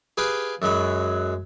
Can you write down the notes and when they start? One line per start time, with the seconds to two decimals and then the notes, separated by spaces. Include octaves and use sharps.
0.17 G4 G#4 B4 F5 G5
0.62 F#2 F#3 G#3 B5